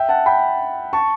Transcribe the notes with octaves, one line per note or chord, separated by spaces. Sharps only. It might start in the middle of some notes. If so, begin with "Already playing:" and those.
Already playing: E5 G5
F#5 A5
G5 B5
A5 C#6